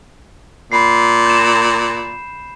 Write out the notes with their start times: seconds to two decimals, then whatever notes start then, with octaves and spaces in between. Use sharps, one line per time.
0.72 A#2 B5 C7
1.26 G6 E7